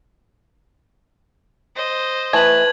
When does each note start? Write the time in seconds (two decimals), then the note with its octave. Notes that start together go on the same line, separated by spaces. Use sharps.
1.76 C5 D#5
2.33 E3 A3 B4 G#6 F#7